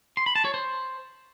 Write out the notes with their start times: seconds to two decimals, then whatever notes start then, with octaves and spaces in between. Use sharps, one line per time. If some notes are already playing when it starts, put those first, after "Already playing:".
0.17 C6
0.26 B5
0.36 A5
0.45 C#5
0.54 C5